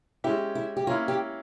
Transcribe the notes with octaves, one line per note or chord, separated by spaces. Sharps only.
G#3 C#4 E4 G4
E4
G4
A#3 C#4 E4 F4
G4